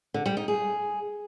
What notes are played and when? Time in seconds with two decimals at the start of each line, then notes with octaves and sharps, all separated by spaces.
0.14 D3
0.26 G3
0.37 D#4
0.48 G#4